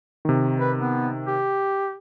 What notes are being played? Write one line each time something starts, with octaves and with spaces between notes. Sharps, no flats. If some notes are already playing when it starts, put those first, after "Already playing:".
C3 D#3
B4
B3
G4